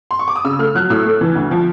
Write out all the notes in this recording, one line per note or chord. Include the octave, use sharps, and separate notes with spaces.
C6
C#6
D6
D#6
C#3 E6
A3 F6
F#3 F#6
A2 E6
A3
E3
D2
F3